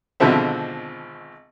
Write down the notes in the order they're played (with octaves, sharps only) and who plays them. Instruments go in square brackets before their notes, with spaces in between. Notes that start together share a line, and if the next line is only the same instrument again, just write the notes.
[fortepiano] G#1 B2 D3 F3 C4 E5